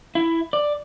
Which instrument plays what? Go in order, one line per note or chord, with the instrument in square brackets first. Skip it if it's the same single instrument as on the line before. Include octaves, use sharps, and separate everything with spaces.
[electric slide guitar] E4
D5